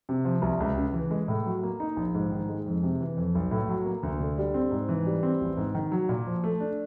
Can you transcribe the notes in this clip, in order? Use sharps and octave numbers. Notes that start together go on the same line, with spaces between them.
C3
F3
C2
C#2
C#3
E3
G#3
A2
F#3
A#3
D#4
A#1
G#2
D#3
G#3
F2
C3
E3
F2
B1
A2
F#3
A#3
D2
D3
G3
C4
G#2
E3
G3
C4
A1
G#2
D#3
F#3
A#2
F3
A3
D4